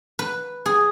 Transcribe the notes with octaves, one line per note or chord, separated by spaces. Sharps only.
B4
G#4